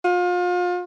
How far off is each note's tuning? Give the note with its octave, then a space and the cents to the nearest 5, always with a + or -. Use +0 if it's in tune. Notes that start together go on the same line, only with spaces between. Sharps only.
F4 +35